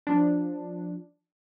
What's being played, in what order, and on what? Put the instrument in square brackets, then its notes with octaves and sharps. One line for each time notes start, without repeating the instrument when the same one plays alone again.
[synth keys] F3 D4